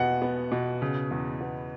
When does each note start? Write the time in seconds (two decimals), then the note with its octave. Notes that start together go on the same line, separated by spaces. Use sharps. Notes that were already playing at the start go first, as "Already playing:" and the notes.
Already playing: E2 B2 B3 F#5
0.22 B3
0.52 B2
0.82 C#3
1.11 E2
1.41 B3